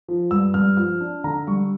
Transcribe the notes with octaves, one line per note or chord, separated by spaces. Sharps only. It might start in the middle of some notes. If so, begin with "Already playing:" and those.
F3
G2 E6
G2 F6
F3 F6
D4
D3 A#5
G3 C#6